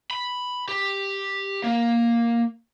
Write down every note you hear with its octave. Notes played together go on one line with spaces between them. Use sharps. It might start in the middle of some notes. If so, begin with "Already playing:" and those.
B5
G4
A#3